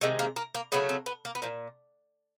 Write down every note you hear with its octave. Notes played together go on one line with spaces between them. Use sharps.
C3 D#3 G#3 A3
A#3
A#3
A#3
C#3 F#3 A3 B3
C4
B3
A#3
B3
A#2 F3 A#3